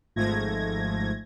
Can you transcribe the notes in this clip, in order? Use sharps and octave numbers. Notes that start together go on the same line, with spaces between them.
G#1 G#2 F3 A3 G#6 A#6